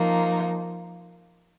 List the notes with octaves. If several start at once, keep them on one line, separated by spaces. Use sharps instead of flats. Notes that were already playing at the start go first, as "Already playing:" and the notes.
Already playing: F3 A#3 D#4